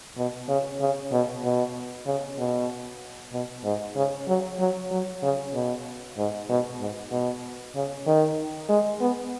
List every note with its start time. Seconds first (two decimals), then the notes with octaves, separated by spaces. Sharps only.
0.17 B2
0.48 C#3
0.80 C#3
1.12 B2
1.44 B2
2.06 C#3
2.38 B2
3.33 B2
3.64 G#2
3.96 C#3
4.28 F#3
4.59 F#3
4.91 F#3
5.23 C#3
5.54 B2
6.17 G#2
6.49 B2
6.80 G#2
7.11 B2
7.75 C#3
8.06 D#3
8.69 G#3
9.01 B3